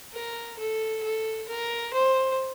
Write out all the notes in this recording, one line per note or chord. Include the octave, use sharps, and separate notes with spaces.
A#4
A4
A4
A#4
C5